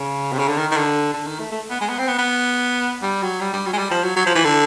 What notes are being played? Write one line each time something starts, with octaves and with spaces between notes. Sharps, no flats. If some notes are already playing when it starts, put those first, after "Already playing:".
Already playing: C#3
C3
C#3
D3
D#3
D#3
D3
D3
D#3
A3
A3
B3
G#3
B3
C4
B3
B3
G3
F#3
G3
G3
F#3
G#3
G3
F3
F#3
F#3
F3
E3
D3